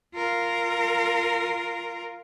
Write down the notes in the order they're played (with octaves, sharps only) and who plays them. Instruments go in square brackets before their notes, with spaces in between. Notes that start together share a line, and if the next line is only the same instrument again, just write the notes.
[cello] F4 A#4